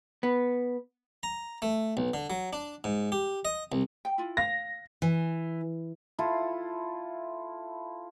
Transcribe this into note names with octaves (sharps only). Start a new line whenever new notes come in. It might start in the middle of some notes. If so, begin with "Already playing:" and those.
B3
A#5
A3
B1
D3
F#3
D4
G#2
G4
D#5
C2
G5
E4 F4
F5 A#6
E3
E4 F4 A4